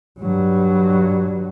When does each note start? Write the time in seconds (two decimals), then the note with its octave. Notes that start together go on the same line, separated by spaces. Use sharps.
0.19 G2 F#3